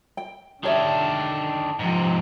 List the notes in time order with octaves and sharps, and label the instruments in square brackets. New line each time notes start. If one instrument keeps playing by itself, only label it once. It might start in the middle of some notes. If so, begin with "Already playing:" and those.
[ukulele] G5
[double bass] D3 [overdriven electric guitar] D#3 D4 [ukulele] G4 C#5 E5
[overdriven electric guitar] G#2 C3 [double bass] F3